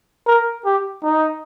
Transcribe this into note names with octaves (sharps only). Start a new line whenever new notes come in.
A#4
G4
D#4